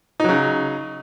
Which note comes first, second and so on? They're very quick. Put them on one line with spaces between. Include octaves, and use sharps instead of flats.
D#4 F#3 C#3